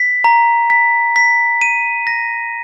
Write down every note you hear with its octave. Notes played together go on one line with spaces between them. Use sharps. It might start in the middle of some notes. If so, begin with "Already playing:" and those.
Already playing: B6
A#5
B6
B6
D#7
A#6